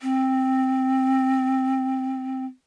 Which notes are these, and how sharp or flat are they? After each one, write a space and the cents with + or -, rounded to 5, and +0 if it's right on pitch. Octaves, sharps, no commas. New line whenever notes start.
C4 +5